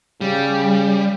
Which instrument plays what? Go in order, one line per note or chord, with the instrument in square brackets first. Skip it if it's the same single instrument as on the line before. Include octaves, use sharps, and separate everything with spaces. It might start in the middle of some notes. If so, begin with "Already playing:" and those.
[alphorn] C#3 [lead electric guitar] G3